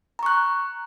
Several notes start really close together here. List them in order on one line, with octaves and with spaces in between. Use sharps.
A#5 C#6 F#6